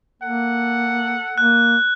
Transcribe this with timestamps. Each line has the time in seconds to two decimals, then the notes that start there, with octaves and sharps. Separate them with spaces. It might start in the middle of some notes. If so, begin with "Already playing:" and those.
0.22 A#3 A4 F#5
1.38 A#3 F#6